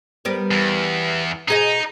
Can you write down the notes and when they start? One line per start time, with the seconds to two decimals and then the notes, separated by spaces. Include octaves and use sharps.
0.25 G3 B3 A#4
0.51 E2
1.48 B2 D#4 G#4 D#5